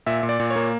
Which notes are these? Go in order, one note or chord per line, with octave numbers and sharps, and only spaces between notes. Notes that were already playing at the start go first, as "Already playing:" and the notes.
A#2 E5
A#2
D5
A#2
C#5
A#3